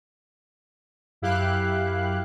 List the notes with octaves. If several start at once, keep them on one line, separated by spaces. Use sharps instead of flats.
F#2 E4 G4 F5 F#6